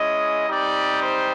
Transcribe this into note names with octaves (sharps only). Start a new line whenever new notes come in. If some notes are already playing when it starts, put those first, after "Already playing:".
Already playing: G#3 C#4 E4 D#5
G3 C4 D#4 G4 D5
C5